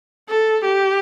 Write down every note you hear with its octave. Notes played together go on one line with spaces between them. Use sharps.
A4
G4